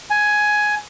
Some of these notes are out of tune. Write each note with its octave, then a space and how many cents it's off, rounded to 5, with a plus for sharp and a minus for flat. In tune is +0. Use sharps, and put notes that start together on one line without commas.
G#5 +10